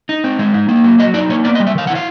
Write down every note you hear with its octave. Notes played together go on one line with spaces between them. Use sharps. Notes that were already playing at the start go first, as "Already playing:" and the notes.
D#4
C4
G#3
D#4
A#3
F#3
F#3 D#5
D#4 D5
A#3 C#5
B3 D5
D#5
G3
E5
D#3 F5
F#5
E4
F5